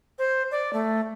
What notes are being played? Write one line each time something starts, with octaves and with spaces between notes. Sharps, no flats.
C5
D5
A3